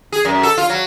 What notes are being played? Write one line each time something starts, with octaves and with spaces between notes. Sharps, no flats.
G#4
F#2
A4
F4
F#3